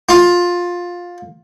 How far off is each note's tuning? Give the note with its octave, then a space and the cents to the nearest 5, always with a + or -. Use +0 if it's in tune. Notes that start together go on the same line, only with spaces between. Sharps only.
F4 +15